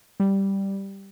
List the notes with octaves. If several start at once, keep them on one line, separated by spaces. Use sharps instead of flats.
G3